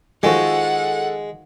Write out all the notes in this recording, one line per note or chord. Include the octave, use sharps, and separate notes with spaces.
D#3 F3 G#3 F#4 G#4 A4 F#5